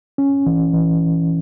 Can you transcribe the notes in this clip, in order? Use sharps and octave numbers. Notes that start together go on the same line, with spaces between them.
C#4
E3
E3